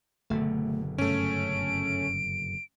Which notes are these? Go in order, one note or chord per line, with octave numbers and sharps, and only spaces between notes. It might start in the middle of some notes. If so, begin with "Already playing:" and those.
F#1 B2 D3 A3
G2 A3 C#4 D7